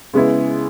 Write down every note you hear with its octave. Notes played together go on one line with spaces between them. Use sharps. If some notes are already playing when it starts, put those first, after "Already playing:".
C#3 G#3 B3 E4